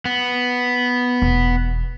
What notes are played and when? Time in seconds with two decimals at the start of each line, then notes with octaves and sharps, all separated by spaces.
0.05 B3
1.22 E1